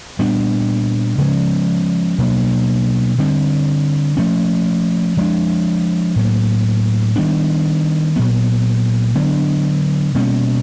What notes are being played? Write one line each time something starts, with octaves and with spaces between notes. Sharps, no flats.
A#2 G3 B3 D4
C#3 F3 G#3 C#4
B2 F#3 A#3 D4
D3 G3 C4
F3 A3 C#4
F3 G#3 B3 D4
A2 F#3 A#3
D#3 G3 B3 D4
A#2 F#3 B3
D3 F#3 B3 D4
B2 G3 A#3 C#4